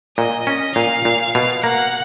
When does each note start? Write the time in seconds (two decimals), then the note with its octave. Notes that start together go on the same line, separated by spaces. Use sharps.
0.17 A#2 D#5
0.47 C#4 D#5
0.76 A#2 F5
1.05 A#2
1.34 B2 F5
1.64 A#3 F#5